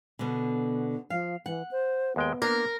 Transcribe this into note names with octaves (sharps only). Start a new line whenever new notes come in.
B2 D3
F3 F5
E3 F#5
C5
D#2 G#3 B3 G5
A#3 D4 A#4